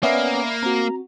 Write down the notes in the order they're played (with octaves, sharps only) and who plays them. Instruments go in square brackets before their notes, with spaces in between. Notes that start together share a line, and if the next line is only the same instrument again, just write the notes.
[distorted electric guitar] A#3 [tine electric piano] B3 C#4 [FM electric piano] D5 E5 B5
[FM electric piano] C4 F#4 [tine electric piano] A#5